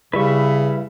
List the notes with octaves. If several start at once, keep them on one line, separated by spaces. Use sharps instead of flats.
C#3 G3 E4 B4 E5 C#6